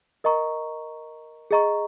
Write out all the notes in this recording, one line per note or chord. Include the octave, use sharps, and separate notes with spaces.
A#4 D#5 A#5 C#6
G#4 D#5 A#5 C#6